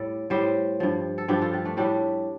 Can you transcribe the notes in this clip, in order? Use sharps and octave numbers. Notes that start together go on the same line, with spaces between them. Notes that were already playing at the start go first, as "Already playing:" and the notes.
Already playing: A2 G3 A4 D5
A2 G3 G4 C5
G2 F3
A4
G2 F3 D4 G4
F4 A4
D4 G4
A3 D4
A2 G3 D4 G4